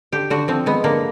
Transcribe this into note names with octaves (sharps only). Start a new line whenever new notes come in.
D3 G4
D3 F#4
F3 C4
G#3 B3
D3 A#3